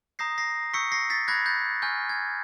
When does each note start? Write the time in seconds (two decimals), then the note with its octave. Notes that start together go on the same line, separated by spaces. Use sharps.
0.19 A#5 D#6 G6 A#6 C7
0.38 A#6 C7
0.73 C#6 E6 G6 B6 C#7
0.92 A#6 C7
1.10 A6 B6
1.28 B5 D6 F#6 G#6 A#6
1.46 G6 A6
1.82 G#5 C#6 F6 G6
2.09 G#6